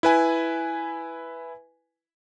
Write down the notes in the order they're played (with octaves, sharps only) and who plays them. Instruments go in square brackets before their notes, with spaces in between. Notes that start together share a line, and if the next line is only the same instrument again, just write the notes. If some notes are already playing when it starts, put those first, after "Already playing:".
[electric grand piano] E4 B4 G#5